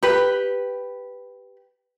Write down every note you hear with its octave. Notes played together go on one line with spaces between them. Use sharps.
G4 B4